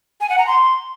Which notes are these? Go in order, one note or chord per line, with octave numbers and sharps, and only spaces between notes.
G#5
F#5
A#5
C6